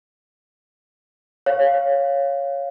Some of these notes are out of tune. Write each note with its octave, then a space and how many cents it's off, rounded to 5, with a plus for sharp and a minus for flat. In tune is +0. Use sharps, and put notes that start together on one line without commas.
C#5 +0 F5 +0